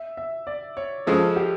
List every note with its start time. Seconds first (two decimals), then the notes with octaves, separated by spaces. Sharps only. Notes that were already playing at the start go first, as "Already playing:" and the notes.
Already playing: E5
0.17 E5
0.47 D5
0.77 C#5
1.07 C#3 F3 G#3 A4
1.36 G4